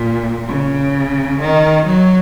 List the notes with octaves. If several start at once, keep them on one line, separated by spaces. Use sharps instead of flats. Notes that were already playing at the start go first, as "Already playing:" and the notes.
Already playing: A#2
C#3
D#3
F#3